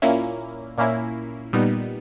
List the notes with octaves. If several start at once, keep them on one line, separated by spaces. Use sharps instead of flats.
A#2 A#3 C#4 E4
A#2 A#3 C#4 E4
A#2 G3 B3 D#4